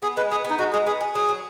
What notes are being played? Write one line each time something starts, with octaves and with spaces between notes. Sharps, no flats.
B3 G#4
G#3 B4
B3 G#4
B3
D#4
G#3 F#4
G#3 G#4
B3 G#4
G#4
F#3 G#4
F#3